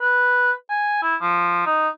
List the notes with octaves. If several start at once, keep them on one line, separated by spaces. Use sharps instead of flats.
B4
G#5
E4
F3
D#4